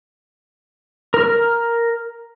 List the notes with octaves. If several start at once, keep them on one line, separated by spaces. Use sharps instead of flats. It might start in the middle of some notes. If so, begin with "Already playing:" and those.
A#4 F6